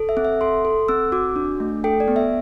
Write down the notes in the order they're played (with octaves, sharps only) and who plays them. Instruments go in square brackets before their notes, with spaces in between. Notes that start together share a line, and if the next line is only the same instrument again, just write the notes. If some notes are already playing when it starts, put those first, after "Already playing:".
Already playing: [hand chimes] A4
E5
C4
E5
A4 C6
A4
C4 E6
F#4 D6
D4
A3
A4 G5
D5
B3
E5